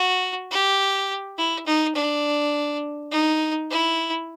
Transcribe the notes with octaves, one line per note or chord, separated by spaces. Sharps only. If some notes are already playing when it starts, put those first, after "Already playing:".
Already playing: F#4
G4
E4
D#4
D4
D#4
E4